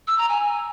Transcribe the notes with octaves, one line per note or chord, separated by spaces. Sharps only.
E6
A#5
G#5